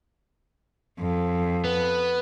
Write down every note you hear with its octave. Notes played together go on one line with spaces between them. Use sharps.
F2
B3